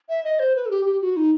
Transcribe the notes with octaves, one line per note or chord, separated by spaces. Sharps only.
E5
D#5
C5
B4
A4
G4
G4
F#4
D#4